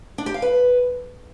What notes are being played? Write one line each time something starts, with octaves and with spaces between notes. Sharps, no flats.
D4
G4
F5
B4